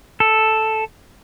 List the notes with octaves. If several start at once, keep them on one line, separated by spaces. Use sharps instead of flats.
A4